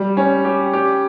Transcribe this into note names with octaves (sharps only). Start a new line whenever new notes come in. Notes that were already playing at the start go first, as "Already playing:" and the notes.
Already playing: G3
C#4
G4
G4